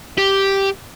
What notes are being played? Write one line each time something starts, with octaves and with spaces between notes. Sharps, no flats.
G4